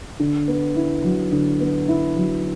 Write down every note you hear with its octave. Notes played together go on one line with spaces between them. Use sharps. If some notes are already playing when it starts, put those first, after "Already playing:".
D3
B3
E4
F#3
D3
B3
E4
F#3